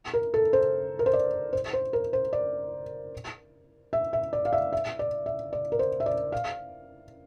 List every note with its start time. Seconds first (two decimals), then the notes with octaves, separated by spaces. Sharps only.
0.13 A#4
0.34 A4
0.53 C5
0.99 A#4
1.06 C5
1.13 D5
1.53 C5
1.73 C5
1.93 A#4
2.13 C5
2.33 D5
3.93 E5
4.13 E5
4.33 D5
4.45 F5
4.53 E5
4.73 E5
4.99 D5
5.26 E5
5.53 D5
5.72 A#4
5.79 C5
6.00 E5
6.06 D5
6.32 F5